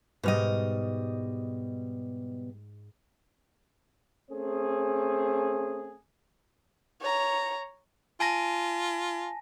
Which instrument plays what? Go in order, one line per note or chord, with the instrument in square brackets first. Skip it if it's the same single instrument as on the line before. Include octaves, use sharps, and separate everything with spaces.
[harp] G#2 F6 [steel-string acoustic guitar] B2 G3 D#5
[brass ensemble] A3 C4 C#4 G#4
[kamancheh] C#5 A#5
[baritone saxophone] F4 [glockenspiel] G#5 A5 A#6